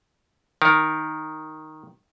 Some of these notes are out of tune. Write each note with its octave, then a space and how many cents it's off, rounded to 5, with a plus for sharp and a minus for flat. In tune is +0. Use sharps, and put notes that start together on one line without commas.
D#3 +0 A#4 +0